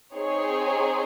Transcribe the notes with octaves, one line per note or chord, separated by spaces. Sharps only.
C4 D#4 G#4 C#5